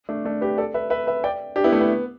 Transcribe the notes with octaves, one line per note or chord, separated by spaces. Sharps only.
A3 D4
A3 D4
G4 B4
A4 D5
B4 E5
B4 E5
B4 E5
D5 G5
D4 G4
B3 E4
A3
B3